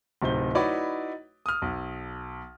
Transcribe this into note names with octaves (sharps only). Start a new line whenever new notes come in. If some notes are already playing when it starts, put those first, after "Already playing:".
D1 C3 D#4 C5 G7
D#4 E4 F#4 B4 C#5 D5
D#6 F6
B1